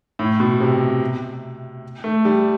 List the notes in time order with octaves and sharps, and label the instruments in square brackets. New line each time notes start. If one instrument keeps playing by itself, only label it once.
[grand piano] A2
B2
C3
A3
G3